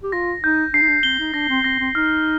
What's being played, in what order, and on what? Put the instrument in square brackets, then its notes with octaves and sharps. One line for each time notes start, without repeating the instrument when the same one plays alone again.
[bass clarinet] G4
[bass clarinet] F4 [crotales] A#6
[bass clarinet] D#4 [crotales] G6
[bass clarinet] D4 [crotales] C7
[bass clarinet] D#4
D4
[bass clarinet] C4 [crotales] G7
[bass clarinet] D#4
[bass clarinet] D4 [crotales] A#6
[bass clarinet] C4
[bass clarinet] C4 [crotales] A#6
[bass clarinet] C4
[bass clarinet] D#4 [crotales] F6